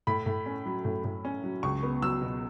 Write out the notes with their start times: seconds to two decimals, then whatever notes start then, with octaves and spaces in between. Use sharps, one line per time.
0.07 A2 B5
0.26 A2
0.46 C#4
0.66 F#3
0.85 A2
1.04 A2
1.25 C#4
1.44 F#3
1.63 C#2 C#6
1.83 B3
2.02 F#3 E6
2.22 B2